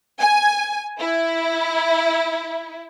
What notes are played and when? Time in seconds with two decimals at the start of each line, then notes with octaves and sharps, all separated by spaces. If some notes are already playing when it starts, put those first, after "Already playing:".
0.20 G#5
1.00 E4